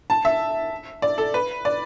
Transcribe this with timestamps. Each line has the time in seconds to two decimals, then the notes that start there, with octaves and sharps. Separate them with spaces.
0.10 A5
0.25 E5
1.02 D5
1.18 A4
1.34 B4
1.65 D5